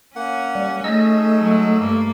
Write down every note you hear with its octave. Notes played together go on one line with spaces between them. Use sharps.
A#3 C#4 F#5
G3
A3 D#4 G#4 D#5 E6
F#3 G#3
G2 A#3